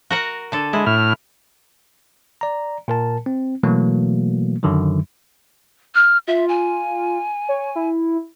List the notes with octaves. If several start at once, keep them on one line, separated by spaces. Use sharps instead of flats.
F#4 A#4 F#5
D3 A4
G#3 E4
A2 F6
D5 A#5
A#2 A#4 A5
C4
B2 E3 F#3 A3 A#3
F#2 D3 D#3 F#3
F6
F4 E5
G#5
C#5
E4